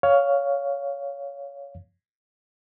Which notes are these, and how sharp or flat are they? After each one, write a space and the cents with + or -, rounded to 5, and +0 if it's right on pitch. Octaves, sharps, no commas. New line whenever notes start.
C#5 +15 F5 +0